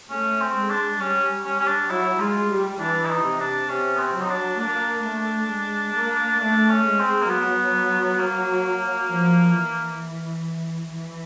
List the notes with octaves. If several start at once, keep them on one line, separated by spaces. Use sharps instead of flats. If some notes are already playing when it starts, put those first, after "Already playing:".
A3 C#4
C4
G#3
D4
G3 C#4
C#4
C#4
D4
F#3 E4
G#3 F4
G3
E3 D4
E4
D#4
C3
D4
C3 C#4
B3
C4
F#3
D#4
D4
A#3 D4
A3
G#3
A#3
A3 D4
C#4
G#3
C4
A#3
F#3 B3
A#3
F3
E3
E3